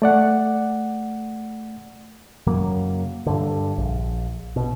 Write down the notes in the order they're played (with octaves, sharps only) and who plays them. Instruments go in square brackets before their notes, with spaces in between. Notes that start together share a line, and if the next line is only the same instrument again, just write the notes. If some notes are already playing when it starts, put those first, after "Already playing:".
[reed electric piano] A3 D5 F#5
[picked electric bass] F#2 C#3 F#3 A#3
G2 D3
A#1
B2